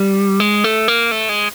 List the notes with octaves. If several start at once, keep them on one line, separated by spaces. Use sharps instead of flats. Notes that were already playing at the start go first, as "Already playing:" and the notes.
Already playing: G3
G#3
A3
A#3
A3
G#3